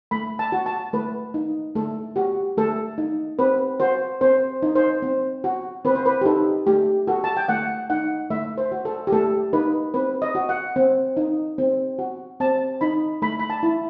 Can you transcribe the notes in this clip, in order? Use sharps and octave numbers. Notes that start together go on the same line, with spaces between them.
A3 B5
A5
F#4
A5
A3 B4
D#4
A3 A4
F#4 G4
A3 A4
D#4
C4 B4
F#4 C5
C4 C5
D#4
C5
C4
F#4
C4 B4
C5
B4
G4
D#4 A4
A3 G4
F#4 A4
A5
G5
A3 F#5
D#4 F#5
A3 E5
C5
F#4
A4
G4
A3 A4
D#4 B4
C4 B4
D#5
F#4
F#5
C4
D#4
C4
F#4
C4 A5
D#4 B5
A3 B5
B5
A5
E4